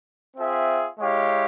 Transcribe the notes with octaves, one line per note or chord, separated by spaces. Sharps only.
C4 F4 G#4 E5
G#3 E4 G4 C#5 F5